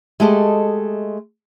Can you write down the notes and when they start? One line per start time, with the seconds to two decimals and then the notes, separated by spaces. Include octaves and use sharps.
0.20 G#3 A3 G4 A4 D#5